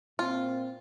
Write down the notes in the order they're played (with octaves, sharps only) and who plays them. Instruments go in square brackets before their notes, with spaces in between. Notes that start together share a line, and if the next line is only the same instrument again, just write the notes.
[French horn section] A#2 C4 [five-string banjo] F4